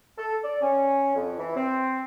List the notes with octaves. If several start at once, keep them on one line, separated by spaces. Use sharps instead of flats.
A4
D5
C#4
F2
E3
C4